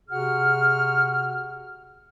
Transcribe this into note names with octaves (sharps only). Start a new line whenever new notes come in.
C3 F#4 G#4 F#5 F6